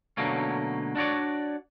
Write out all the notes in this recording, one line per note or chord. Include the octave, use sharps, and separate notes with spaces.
B2 D3 F#3 A3 A#3 C#4
D4 F#4 C#5 D5